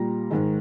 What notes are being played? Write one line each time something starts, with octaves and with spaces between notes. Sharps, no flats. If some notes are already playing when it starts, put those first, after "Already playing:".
Already playing: A#2 G3 A#5
G#2 D#3 G#3